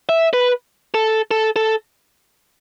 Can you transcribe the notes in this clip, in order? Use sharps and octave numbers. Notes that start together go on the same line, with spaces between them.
E5
B4
A4
A4
A4